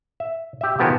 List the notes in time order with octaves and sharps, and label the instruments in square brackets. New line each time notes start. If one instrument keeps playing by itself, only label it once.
[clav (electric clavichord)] E5
G4 E5
D#3 F3 G#3 B3 F#4 G4